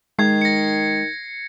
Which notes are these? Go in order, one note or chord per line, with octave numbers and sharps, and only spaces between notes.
D#3 G#3 G#6 C7
A#6 C#7